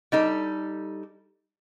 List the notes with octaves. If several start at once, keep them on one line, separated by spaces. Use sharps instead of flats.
G3 D#4 A4